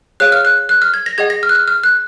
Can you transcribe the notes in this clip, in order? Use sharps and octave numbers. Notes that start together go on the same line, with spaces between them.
G#4 C#5 F5 F#6
F6
F#6
F#6
F6
G#6
A#6
G#4 D#5 F#5 G#6
A#6
F6
F#6
F6
F6
F#6